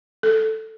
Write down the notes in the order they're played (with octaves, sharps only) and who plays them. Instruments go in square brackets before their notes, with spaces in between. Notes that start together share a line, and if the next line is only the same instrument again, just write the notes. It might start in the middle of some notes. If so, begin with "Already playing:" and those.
[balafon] A4